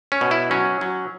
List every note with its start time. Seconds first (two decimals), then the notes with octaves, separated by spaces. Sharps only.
0.12 C#4
0.21 B2
0.31 E4
0.51 F#3 C#4
0.81 F#3